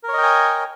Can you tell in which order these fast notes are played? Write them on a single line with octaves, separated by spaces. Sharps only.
A#4 C#5 D#5 G5 G#5